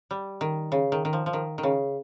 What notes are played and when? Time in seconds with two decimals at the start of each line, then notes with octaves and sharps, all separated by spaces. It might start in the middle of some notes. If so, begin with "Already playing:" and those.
0.11 G3
0.41 D#3
0.72 C#3
0.92 D#3
1.05 D#3
1.13 F3
1.26 F3
1.33 D#3
1.58 D#3
1.63 C#3